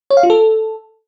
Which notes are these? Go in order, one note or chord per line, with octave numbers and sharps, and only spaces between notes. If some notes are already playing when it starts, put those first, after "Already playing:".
C#5
F5
F4
A4